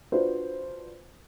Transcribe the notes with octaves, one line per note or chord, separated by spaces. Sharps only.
D4 F4 F#4 B4 C5